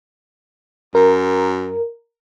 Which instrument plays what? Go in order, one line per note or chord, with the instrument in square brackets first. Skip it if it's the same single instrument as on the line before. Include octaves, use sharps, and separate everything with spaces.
[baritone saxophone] F#2 [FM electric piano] A#4